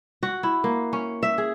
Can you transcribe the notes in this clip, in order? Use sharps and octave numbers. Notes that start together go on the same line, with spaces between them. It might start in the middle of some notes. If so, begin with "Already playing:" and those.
F#4
E4
A#3
C#4
E5
G#4